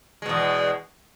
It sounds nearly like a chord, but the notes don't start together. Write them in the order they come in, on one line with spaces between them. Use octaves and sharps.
G#3 B2 E2